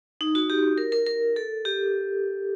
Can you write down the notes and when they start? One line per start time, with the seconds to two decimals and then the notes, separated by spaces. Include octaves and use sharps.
0.21 D#4
0.35 F#4
0.50 G4
0.78 A#4
0.92 A#4
1.07 A#4
1.36 A4
1.65 G4